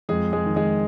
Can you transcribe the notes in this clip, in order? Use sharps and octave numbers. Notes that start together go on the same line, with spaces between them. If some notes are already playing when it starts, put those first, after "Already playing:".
F2 G#3 G#4
G#3 G#4
D#3
G#3 G#4